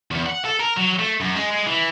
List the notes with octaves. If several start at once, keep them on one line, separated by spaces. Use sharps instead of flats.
E2
F#5
A4
A#4
F#3
A3
F#2
G#3
G#3
E3